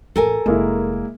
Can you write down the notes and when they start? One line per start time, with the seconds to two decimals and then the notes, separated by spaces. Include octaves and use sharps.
0.16 A1 A#3 A4 A#4 G#5
0.46 F1 G#3 A#3 E4